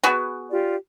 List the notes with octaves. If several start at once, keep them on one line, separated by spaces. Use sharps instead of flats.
B3 F#4 G#4
F4 G4 D5